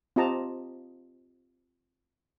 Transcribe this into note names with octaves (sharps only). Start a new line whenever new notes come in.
C4 F4 G4 D#5 A5 A#5